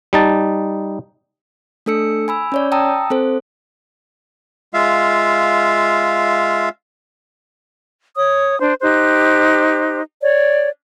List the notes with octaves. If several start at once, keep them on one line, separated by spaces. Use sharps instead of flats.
G3 D#4 A5
A3 D4 A4 E6 C#7
G#5 B5 E6
C#4 C#5 D5
G5 A5 A#5 D#6 E6
C4 A4 C5
G#3 F4 E5 F5
C#5 D#6
D4 C5
D#4 G4 C5 F#6
C#5 D5